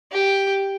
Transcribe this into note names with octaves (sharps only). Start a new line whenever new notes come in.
G4